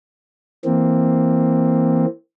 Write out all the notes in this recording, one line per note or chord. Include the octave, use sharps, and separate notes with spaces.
E3 A#3 C4